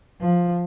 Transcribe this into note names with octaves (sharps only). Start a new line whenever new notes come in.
F3